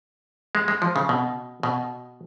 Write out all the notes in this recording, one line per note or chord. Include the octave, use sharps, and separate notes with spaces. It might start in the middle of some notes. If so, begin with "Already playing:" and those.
G#3
G#3
F3
C#3
B2
B2